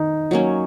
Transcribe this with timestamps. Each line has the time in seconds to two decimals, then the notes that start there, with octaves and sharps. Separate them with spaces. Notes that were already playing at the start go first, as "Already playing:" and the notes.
Already playing: D#3 D#4
0.31 F#3 A#3 C#4